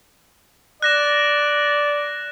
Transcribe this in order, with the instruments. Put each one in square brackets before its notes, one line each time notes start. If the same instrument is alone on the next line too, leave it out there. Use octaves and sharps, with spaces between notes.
[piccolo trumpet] D5 [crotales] F#6 A#6 E7